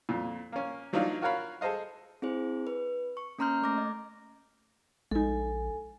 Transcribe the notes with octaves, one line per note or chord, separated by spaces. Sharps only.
F2 A#2
A#3 C#4
F3 F#3 A#3 D4 D#4 F4
F4 F#4 A#4 C#5 F5 B5
G#4 A4 C5 D#5 F5
C4 E4 G#4 C5
B4
C#6
A#3 C#4 A#5 C6 F6 G6
A3 D6 A#6
D#5
A#1 G#3 D#4 A4 G#5